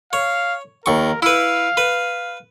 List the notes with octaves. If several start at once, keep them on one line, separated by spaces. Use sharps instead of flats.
C#5 F5
D#2 A#4 C#6
E4 B4 F5
B4